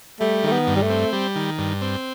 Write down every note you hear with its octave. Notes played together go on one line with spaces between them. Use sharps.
G3 A3
D#3 A3
B3
G2
G3
A3
C4
G3
D#3
G2
C4